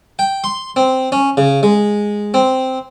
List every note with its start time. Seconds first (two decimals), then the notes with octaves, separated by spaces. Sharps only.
0.19 G5
0.44 C6
0.76 C4
1.12 C#4
1.37 C#3
1.63 G#3
2.34 C4